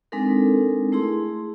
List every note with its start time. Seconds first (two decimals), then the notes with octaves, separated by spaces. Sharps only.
0.12 G#3 C4 D4 D#4 A4 A#4
0.92 A3 E4 G#4 C6